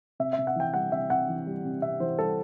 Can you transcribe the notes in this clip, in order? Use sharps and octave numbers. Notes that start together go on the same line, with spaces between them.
C3 E5
E5
C3
F#5
E3 G5
G3 F#5
C3 E5
C3 F#5
E3
G3
C3
C3 E5
E3 C5
G3 A4